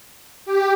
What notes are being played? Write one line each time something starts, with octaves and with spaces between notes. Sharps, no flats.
G4